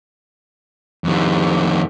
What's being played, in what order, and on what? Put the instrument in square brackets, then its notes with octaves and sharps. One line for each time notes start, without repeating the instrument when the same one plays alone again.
[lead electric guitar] F2 D#3